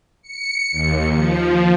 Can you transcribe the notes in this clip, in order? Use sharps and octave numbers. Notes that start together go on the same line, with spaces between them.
C#7
D#2
F3